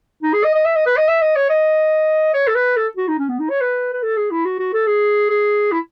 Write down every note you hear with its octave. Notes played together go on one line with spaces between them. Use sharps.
D#4
G#4
D#5
D#5
E5
D#5
B4
D#5
E5
D#5
C#5
D#5
C#5
A4
B4
A4
F#4
D#4
C#4
B3
D#4
C#5
B4
B4
A4
G#4
E4
F#4
F#4
A4
G#4
G#4
E4